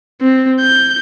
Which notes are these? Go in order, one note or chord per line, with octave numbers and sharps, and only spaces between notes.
C4
G6